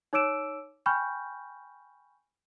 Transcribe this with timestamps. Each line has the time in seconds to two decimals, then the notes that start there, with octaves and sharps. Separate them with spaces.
0.13 D#4 C#5 D6 E6 D7 E7
0.86 G5 G#5 B5 C#6 F6 G6